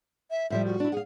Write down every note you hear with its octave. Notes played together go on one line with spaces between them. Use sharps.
E5
A2 F3 G3 E5
F#4
D4 E4
G#4 F5 F#5